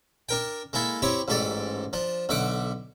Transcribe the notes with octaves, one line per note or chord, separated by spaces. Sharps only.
D4 A#4 G5
G#3 A#3 E4 A4
C4 E4 G4 C#5
A1 G#2 G4 A4 D5
F3 D4
B1 D3 E5 F#5 D6